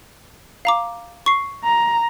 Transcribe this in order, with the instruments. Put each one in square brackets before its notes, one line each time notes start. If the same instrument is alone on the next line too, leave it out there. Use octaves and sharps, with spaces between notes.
[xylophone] F5 A#5 D6
C#6 C7
[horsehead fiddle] A#5